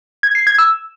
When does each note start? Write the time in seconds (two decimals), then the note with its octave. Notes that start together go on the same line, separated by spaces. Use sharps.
0.23 G#6
0.35 C7
0.47 G#6
0.58 E6